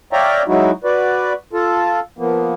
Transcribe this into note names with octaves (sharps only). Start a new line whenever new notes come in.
C#5 D5 E5 F5 G5 A#5
F#3 G#3 D#4 E4 F#4
F#4 B4 D5
F4 A4
F3 A#3 B3